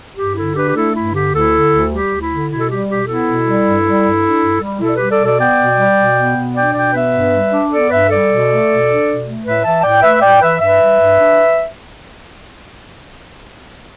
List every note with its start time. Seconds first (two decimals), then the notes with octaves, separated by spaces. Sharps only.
0.16 G2 G4
0.35 D3 E4 A4
0.54 D4 G4 B4
0.69 G4
0.74 A3 E4 A4
0.93 G2 E4
1.13 D3 G4
1.32 D2 E4 A4
1.52 D3
1.71 D2
1.90 G3 G4
2.10 D2
2.19 E4
2.29 D3
2.48 B2 E4
2.58 A4
2.67 G3 G4
2.87 B2 G4
3.06 B3 E4 A4
3.26 B2
3.45 G3
3.65 G2
3.84 G3
4.03 G2
4.22 D4
4.41 G2
4.61 G3
4.81 B2 E4 A4
4.88 D5
4.95 G3 G4 B4
5.09 A4 D5
5.19 B2
5.25 A4 D5
5.38 B3 D5 G5
5.58 B2
5.77 G3
5.97 B2
6.16 B3
6.36 B2
6.54 D4 D5 G5
6.73 B2 D5 G5
6.93 B3 B4 E5
7.12 G2
7.32 G3
7.51 D4
7.70 B3 A4 D5
7.89 G2 B4 E5
8.09 G3 A4 D5
8.29 B2
8.48 A3
8.67 B2
8.86 D4
9.07 B2
9.26 A3
9.44 A2 B4 E5
9.64 E3 E5 A5
9.83 A2 D5 G5
10.02 A3 B4 E5
10.22 A2 D5 G5
10.41 E3 B4 E5
10.60 G2 B4 E5
10.81 G3
11.00 G2
11.19 D4